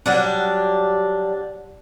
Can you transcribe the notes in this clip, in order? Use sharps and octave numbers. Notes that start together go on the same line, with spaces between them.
F#3 G3 D4